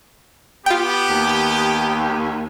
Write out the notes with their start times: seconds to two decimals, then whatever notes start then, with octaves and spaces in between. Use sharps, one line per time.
0.66 B3 F4 G4 G5
1.10 D#2